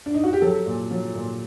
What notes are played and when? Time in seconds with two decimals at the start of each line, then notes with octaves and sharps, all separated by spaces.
0.06 D4
0.15 D#4
0.24 F#4
0.33 G4
0.42 F#3 A4
0.66 A#2
0.91 F#3
1.15 A#2